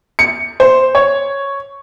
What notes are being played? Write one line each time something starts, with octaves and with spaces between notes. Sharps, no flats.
C#7
C5
C#5